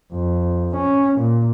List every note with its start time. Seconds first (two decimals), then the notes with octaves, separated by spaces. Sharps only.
0.13 F2
0.76 C#4
1.19 A#2